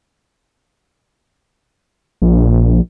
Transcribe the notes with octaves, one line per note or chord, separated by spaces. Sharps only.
A#1